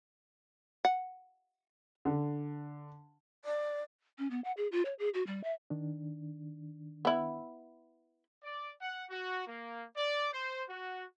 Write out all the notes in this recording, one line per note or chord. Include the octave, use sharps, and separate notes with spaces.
F#5
D3
D5
C#4
B3
F#5
G#4
F4
C#5
G#4
F#4
G3
E5
D#3 D4
B3 E4
D5
F#5
F#4
A#3
D5
C5
F#4